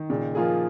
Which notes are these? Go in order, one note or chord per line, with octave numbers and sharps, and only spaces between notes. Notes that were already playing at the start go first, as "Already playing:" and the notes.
Already playing: D#3
A#2 C#3
F3 A#3 F4 G#4